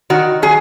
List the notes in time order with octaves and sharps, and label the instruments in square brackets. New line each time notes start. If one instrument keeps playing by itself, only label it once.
[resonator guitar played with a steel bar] D#3 F#4
F#3 G#4